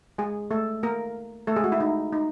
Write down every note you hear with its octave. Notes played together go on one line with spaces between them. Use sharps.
G#3 G#4
A3 A4
A#3 A#4
A3 A4
G#3 G#4
F#4
E4
D#4
D#4